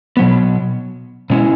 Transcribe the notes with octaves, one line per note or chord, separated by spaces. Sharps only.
B2 F#3 B3
B2 G#3 C#4 E4